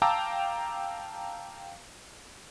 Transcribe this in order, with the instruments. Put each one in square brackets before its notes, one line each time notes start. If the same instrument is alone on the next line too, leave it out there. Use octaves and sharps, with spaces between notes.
[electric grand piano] F5 G5 A5 A#5 D6 E6